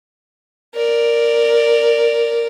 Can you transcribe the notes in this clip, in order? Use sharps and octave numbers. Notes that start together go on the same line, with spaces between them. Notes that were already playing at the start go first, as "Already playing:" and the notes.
A#4 D5